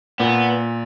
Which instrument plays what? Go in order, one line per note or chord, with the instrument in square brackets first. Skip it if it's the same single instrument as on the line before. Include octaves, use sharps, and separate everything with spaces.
[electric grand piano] A#2 [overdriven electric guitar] B3